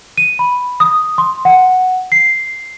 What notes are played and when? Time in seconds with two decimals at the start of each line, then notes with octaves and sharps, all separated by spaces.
0.18 D#7
0.39 B5
0.80 D#6
1.18 C6
1.45 F#5
2.12 C7